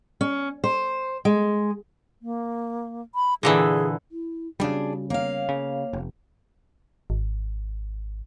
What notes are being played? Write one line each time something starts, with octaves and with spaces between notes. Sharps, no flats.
C#4
C5
G#3
A#3
B5
A#2 D3 E3 G#4
E4
C#3 G3 D4 F#4 G#4
A#3 C#5 F5
C#3
F1
G#1